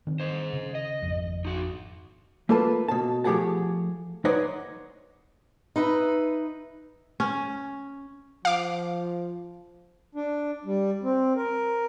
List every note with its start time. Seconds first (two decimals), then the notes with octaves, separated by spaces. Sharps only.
0.07 D#3 C4
0.20 C5 D#5
0.53 C#3
0.75 D#5
1.02 G#1 F2
1.45 D#4 F#4
2.49 A3 A#3 F4 A4 B4 A5
2.88 B2 A5
3.24 F3 A3 G4 G#4 F#5 A5
4.25 D#4 B4 C#5 D5 F#5 C6
5.76 D#4 B4 E5
7.20 C#4
8.45 F3 F5 D6
10.15 D4
10.65 G3
11.03 C4
11.36 A#4